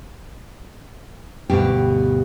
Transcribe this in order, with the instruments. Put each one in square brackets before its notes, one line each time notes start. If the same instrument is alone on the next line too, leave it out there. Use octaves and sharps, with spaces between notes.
[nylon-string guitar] D2 G2 B2 G4